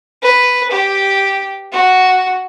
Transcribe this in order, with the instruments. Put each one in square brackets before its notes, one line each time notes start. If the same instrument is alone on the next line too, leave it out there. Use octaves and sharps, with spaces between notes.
[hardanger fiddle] B4
G4
F#4